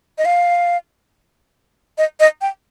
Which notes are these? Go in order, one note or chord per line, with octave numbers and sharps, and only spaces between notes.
D#5
F5
D#5
D#5
G5